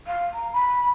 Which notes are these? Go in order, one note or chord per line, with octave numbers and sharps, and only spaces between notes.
F5
A#5
B5